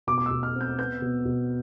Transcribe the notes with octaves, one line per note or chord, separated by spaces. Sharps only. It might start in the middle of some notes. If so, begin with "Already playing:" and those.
B2 D6
D6
E6
B2
F6
C4
G6
B3 G6
B2
B2